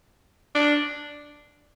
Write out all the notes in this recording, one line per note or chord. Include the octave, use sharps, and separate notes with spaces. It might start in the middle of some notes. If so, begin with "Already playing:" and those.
D4